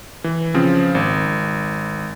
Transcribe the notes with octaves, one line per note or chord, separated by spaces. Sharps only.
E3
C#3 F3 C4
G#1